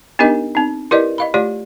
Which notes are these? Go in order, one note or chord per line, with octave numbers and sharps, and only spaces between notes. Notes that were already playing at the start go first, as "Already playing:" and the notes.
B3 D4 D#4 G4 A#4 D#5
C4 D#4
E4 G4 A#4 B4 D5 D#5
D#5 F5 B5
A3 F4 G4 C#5 D5